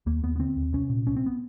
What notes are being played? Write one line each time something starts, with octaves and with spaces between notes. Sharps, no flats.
D#2 A#3
D#2 B3
B3
D3 C4
D#2
C2 C#4
A#2
C2 C#4
C4
B3